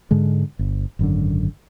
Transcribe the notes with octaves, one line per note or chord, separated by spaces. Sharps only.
G#2 D3 G#3
G1
G#1 F#2 D3